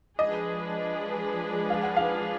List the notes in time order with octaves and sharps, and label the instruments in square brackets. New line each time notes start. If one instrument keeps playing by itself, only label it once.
[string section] F3 G#3 D4 G#4 B4 [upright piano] D#5
[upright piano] F5
F#5
F5